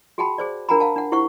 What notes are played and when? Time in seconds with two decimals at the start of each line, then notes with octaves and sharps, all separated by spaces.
0.18 F#4 G#4 F#5 G5 A5 B5
0.38 G#4 C5 D5
0.69 D4 A#4 F#5 G#5 A#5 B5
0.80 F5 F#5 A5
0.96 D4 F#5
1.12 E4 G4 C5 F#5 C#6